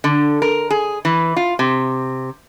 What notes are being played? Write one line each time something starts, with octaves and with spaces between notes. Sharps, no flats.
D3
A#4
G#4
E3
F4
C3